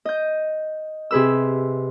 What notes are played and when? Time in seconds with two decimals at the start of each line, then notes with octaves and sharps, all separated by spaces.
0.05 D#5 G6
1.11 C3 G#4 B4 E6